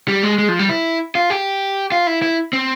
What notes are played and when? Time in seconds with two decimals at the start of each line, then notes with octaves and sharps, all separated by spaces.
0.08 G3
0.23 G#3
0.38 G#3
0.49 F3
0.59 G3
0.69 E4
1.15 F4
1.30 G4
1.92 F4
2.07 E4
2.22 E4
2.53 C4